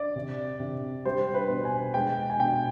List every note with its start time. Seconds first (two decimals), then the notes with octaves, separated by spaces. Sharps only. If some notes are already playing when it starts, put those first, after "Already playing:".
Already playing: D5
0.16 C3
0.60 C3
1.05 G3 C5
1.34 B4
1.49 B2
1.65 G#5
1.94 G#3 G5
2.30 G#5
2.40 B2 G5